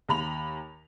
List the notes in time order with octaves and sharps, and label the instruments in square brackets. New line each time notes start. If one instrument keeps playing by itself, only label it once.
[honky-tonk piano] D#2 A#5 B5 F7